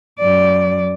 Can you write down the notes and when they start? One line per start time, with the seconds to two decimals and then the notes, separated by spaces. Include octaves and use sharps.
0.19 F#2 D5